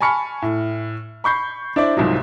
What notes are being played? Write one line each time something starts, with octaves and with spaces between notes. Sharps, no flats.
G#5 A5 B5 C#6 F6 C#7
A2
B5 C#6 G6 C7
D4 E4 C5 D5
C2 G#2 F3 F#3